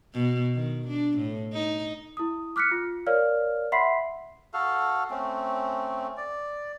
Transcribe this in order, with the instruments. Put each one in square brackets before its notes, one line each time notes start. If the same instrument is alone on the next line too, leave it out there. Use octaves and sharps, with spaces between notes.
[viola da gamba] B2
D#3
D4
A2
D#4
[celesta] E4 D#6
D6 F6 F#6 B6 C#7
F4
A#4 C#5 D5 F5 F6
E5 F#5 B5 C6 B6 C7
[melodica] F#4 A4 F5
A3 C4 C#4
D5